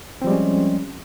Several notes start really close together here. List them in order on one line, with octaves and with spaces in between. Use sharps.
C4 F3 G3 G#3 C#4